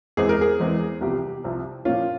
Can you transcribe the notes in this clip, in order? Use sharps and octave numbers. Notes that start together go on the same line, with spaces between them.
E2 E3 G#3 C4 G#4
A#4
G#4
E2 E3 G#3 C4
C2 C3 F3 G4
C2 C3 F3
A#2 F3 A#3 C#4 F4